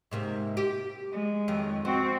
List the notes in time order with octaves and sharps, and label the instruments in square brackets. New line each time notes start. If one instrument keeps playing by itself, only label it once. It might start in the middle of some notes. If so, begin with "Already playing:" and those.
[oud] G#2 C3 A#3
G4
[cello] G#3
[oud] F2 D#3 F#3
[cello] C4 F#4 [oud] C5